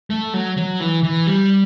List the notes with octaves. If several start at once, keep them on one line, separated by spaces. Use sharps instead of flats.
A3
F#3
F#3
E3
E3
G3